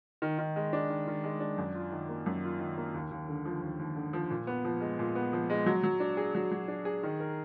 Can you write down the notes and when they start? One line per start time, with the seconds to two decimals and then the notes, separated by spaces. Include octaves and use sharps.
0.22 D#3
0.39 D#3
0.56 G#3
0.73 D4
0.89 D#3
1.07 D#3
1.24 G#3
1.40 D4
1.58 F#2
1.74 F4
1.92 D#3
2.09 A#3
2.26 F#2
2.44 F4
2.60 D#3
2.77 A#3
2.94 D#2
3.11 D#2
3.28 D3
3.45 F3
3.62 D#2
3.79 D#2
3.96 D3
4.13 F3
4.30 A#2
4.47 B3
4.65 F3
4.81 G#3
4.99 A#2
5.15 B3
5.33 F3
5.50 G#3
5.66 F#3
5.83 F#3
6.00 D4
6.17 G#4
6.35 F#3
6.51 F#3
6.68 D4
6.85 G#4
7.03 D#3
7.20 A#4